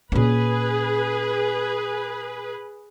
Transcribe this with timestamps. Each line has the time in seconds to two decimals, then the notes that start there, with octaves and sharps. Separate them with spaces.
0.12 A#2 C#4 G#4 B4